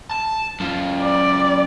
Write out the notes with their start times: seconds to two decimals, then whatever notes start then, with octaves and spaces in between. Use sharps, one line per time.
0.11 A5
0.60 F#2 F4
1.01 D5